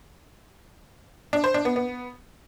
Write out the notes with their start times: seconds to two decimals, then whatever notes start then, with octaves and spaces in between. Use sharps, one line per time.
1.33 D4
1.44 C5
1.54 D4
1.65 B3
1.76 B3